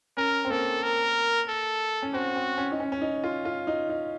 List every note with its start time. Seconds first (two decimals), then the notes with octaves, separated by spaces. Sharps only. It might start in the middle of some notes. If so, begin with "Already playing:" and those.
0.17 C#4 A#4
0.45 C4
0.50 A#3 A4
0.83 A#4
1.48 A4
2.02 C#4
2.13 C4 F#4
2.36 C4
2.58 C#4
2.72 D#4
2.80 C#4
2.92 C#4
3.01 D#4
3.24 F4
3.45 F4
3.67 D#4
3.89 D#4